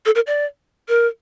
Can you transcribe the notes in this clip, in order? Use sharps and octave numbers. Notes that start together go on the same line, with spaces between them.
A4
A#4
D5
A#4